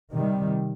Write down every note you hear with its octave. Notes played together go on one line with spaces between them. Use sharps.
C3 D#3 G3